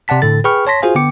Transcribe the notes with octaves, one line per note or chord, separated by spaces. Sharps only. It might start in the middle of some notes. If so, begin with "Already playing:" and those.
C3 D5 F#5 A5 B6
A2 D3 A4 A6
G#4 B4 G5 B5 C#6 F6
C#5 A5 C6 A#6 B6
F4 F#4 G#4 C5 F5 G#5
D3 B3 G5 D6 C#7